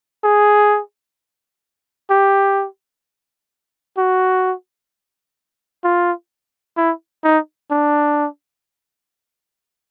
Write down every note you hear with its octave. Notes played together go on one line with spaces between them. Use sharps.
G#4
G4
F#4
F4
E4
D#4
D4